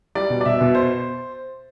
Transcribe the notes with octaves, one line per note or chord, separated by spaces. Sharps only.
G3 D5
B2
D5
B2 E5
B2
C5